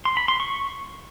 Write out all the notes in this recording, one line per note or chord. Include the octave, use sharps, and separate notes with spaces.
C6
B5
C6
C#6